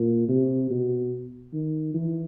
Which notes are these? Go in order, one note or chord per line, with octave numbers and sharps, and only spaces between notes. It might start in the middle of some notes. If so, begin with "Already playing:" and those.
Already playing: A#2
C3
B2
D#3
E3